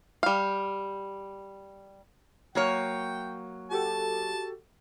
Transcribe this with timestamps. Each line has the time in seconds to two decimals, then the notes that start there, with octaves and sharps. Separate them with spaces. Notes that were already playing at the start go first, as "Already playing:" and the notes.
0.23 G3 F5
2.55 F#3 A#3 C#5 G5
3.71 F#4 G4 A4 A5